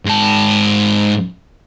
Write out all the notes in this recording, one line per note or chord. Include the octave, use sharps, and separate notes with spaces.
G#2 A5